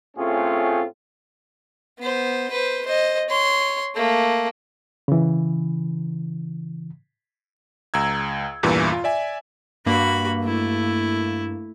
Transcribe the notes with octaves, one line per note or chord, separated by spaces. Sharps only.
A2 A3 C4 C#4 F4 G#4
B3 C5
B4 C5
C5 D#5
C#5 C6
A3 A#3
C#3 E3
C#2 A#5 E6 G#6
E2 G2 A#2 E3
F4
D5 E5 G#5
G2 A#3 F#4 B5
A3 E4